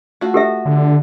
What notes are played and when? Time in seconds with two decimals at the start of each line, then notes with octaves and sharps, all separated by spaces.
0.21 A3 F4 F#4
0.34 G4 A4 E5
0.65 D3